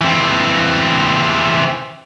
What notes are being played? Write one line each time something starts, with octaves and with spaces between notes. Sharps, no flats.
E3 C4